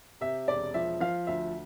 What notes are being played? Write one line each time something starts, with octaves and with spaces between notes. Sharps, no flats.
C3 E5
E1 D5
F3 E5
F3 F5
D2 E5